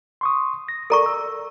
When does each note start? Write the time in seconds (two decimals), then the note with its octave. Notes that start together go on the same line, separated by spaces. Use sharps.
0.21 C6 C#6 D#6
0.69 A#6
0.90 A4 A#4 D5 A#5 C#6
1.06 E6